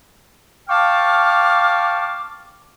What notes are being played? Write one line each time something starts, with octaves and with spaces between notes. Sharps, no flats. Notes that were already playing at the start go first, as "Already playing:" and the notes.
F5 G5 A5 C#6 D6 F6